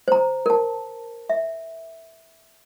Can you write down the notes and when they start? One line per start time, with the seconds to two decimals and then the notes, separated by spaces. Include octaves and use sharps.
0.08 C5 A#5
0.46 A#4 A5
1.30 E5